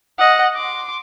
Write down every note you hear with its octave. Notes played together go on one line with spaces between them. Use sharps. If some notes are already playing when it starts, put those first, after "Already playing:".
D#5 F#5
C6 D6